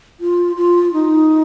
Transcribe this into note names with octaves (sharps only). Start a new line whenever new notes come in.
F4
F4
D#4